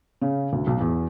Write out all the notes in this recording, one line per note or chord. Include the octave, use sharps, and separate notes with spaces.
C#3
D2
B1
E2